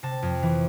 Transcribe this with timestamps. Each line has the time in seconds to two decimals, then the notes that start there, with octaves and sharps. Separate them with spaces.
0.03 C3 A5
0.22 F2
0.43 E3